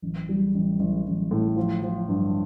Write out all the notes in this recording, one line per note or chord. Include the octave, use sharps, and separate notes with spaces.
A1
G3
A1
A1
A1
A2
F3
F3
G2